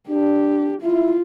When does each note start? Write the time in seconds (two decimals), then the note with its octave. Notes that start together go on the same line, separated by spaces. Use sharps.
0.09 D4 G4
0.81 E4 F4